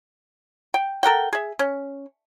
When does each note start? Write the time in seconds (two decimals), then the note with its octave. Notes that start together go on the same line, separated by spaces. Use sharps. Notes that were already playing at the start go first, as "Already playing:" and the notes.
0.74 G5
1.03 A4 A#4 F#5 G5
1.33 G#4 E5
1.59 C#4